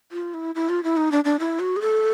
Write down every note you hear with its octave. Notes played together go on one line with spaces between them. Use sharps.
F4
E4
E4
F4
E4
D#4
D4
D4
E4
F#4
G#4
A4